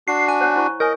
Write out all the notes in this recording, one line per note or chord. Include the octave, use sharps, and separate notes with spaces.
D4 F#4 C7
G#5
C5 C#5 F#5
E4 C5 C#6
A#4 C#5 D#5 G#5